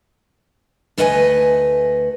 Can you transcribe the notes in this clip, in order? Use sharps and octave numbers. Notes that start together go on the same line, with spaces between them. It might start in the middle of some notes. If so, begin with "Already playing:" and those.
D2 A3 B4 D#5 F#5 G#5